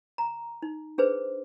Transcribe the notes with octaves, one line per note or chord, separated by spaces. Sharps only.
A#5
D#4
D4 G#4 B4 C5